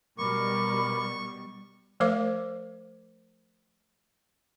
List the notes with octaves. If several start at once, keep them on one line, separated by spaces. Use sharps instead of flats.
B2 G3 A#4 B5 C#6 D6
F3 A3 A#4 C5 F5 D6